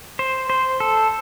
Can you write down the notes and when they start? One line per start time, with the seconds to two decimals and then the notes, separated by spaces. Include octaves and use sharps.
0.19 C5
0.50 C5
0.80 A4